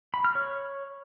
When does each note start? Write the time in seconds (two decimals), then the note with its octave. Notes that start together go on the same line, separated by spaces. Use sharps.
0.14 B5
0.24 F6
0.35 C#5